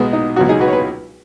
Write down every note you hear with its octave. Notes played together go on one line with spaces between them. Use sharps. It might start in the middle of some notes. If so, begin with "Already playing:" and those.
Already playing: B1 B2 G#3 B3 F#4
D#4
C#2 B2 F#3 F#4
D#4 G#4
F#4 B4
C#5
B4